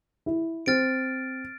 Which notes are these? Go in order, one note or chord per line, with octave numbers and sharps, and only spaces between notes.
E4
C4 F6 A6 D7